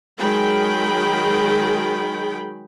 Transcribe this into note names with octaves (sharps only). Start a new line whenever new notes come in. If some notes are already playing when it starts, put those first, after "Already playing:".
D#3 F#3 G#3 G#4 G5 B5